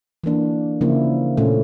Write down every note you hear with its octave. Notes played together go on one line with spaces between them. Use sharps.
E3 A#3 D4
C#3 F3 A#3 E4
A#2 A3 C#4